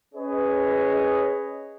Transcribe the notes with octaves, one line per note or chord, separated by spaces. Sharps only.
C#4 G#4 B4 C#5 D#5